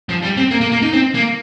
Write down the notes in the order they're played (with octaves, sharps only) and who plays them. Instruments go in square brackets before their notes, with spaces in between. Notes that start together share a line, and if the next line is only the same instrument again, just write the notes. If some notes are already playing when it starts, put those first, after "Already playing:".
[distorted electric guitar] F3
G3
C4
A#3
A#3
A#3
D#4
C4
A#3